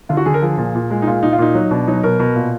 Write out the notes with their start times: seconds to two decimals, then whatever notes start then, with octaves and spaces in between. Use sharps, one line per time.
0.09 D3 F4
0.17 F#4
0.26 D3 G#4
0.34 A#4
0.42 F3 G#4
0.58 A#2
0.75 A#2
0.90 G#3
1.02 D#4
1.07 A#2 F4
1.23 A#2 D#4
1.33 F4
1.38 A#2 D#4
1.54 F#3
1.71 B2 D4
1.87 F#3 D#4
2.03 B2 A#4
2.20 B2
2.36 A#2